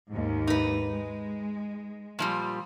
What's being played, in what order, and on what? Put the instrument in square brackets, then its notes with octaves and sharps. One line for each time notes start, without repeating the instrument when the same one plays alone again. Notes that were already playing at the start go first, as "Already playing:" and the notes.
[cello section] D#2 G#2
[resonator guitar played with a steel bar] D#4 B4
[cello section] G#3
[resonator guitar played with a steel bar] A#2 F3 G3